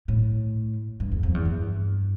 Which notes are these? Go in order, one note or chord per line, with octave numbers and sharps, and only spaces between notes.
A2
G2
E2
F2
E2
G2